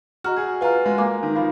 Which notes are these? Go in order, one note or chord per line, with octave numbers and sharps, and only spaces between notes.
F#4 D#5 A#5 F6
G#4
F4 B4 F5 A#5 F6
G#3
A#3 F5 G#5 D6
D#3
F3 F5 B5